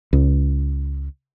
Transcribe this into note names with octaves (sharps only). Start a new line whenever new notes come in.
C#2